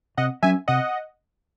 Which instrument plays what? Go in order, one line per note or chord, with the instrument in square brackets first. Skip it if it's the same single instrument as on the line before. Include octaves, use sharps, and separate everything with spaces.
[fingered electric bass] C3 [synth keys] D#5 F#5
[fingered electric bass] F#3 C#4 [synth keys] E5 G#5
[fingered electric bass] C3 [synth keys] D#5 F#5